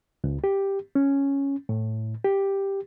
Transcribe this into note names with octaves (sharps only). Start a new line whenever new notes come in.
C#2
G4
C#4
A2
G4